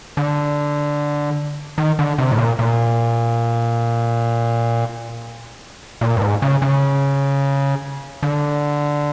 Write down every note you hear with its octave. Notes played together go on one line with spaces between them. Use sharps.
D3
D#3
D3
C3
A2
A#2
A#2
A#2
G2
G#2
C#3
C#3
D3